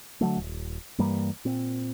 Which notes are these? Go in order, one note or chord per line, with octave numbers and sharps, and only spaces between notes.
D3 F#3 A3
D#1
G2 E3 G3 A#3
A#2 C4